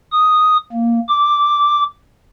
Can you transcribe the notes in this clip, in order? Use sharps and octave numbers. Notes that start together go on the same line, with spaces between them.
D#6
A#3
D6